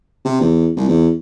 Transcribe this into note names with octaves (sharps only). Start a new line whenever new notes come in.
C3
E2
C2
E2